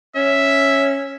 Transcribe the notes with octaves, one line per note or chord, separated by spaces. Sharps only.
C#4 E5